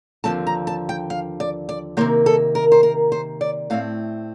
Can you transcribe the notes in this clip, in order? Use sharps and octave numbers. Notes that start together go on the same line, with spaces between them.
D#2 D3 F3 A3 C4 A5
A#5
A5
G5
F5
D5
D5
C3 D#3 A#3 C5
A4
A#4
C5
A#4
C5
D5
A2 A3 C4 F5